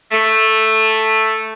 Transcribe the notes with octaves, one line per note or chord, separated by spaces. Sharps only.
A3